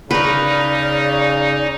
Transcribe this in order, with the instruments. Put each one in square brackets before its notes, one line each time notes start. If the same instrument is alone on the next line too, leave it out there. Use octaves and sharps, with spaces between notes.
[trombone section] C#3 [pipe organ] D#4 [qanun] A#4 B4 [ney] D5